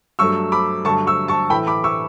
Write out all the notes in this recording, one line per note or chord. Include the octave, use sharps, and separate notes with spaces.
G2 F#3 A3 C#6 E6
B5 D6
G2 D3 F#3 A3 A5 C#6
C#6 E6
A5 C#6
A2 E3 A3 G5 B5
B5 D6
C#6 E6